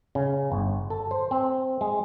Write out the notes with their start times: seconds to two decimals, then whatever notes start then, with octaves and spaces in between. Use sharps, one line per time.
0.15 C#3
0.52 G1
0.90 A4
1.11 C5
1.31 C4
1.81 G#3